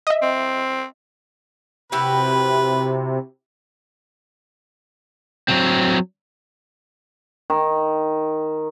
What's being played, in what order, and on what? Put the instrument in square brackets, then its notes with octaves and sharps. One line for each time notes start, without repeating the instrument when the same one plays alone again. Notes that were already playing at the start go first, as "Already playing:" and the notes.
[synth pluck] D#5 E5
[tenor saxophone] C4
[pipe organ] C3 [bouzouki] E4 F#4 G4 [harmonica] B4
[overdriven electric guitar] F#3 C4
[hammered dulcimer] D#3